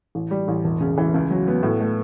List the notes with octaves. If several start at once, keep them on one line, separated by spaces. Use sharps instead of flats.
A1
G3
A1
E1
C#3
E3
C#2
F#3
B3
A2
A3